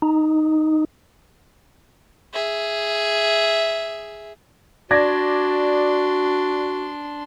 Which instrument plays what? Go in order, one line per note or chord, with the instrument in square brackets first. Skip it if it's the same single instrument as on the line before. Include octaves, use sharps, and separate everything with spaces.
[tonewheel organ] D#4
[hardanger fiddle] G#4 E5
[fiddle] D4 C6 [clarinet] F#4 [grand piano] D5 G#6 A#6